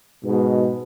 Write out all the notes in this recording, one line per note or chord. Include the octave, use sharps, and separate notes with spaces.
G#2 B2